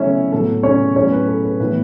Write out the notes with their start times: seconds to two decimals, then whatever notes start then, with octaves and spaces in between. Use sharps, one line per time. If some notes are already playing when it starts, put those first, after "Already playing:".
Already playing: C#3 F#3 A3 C#4 E4 C#5 E5
0.32 A2 F#3 B3 A4
0.63 C#4 C#5
0.96 A2 F#3 B3 C#4 C#5
1.12 B4
1.28 A4
1.44 B4
1.60 A2 E3 B3 B4